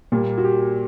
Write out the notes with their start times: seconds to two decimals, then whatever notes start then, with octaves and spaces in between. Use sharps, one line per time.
0.12 A#2 G3 A#3
0.38 F#4
0.44 G4